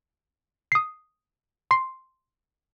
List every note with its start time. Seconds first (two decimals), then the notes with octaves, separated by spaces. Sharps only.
0.72 D#6 C7
1.71 C6 C7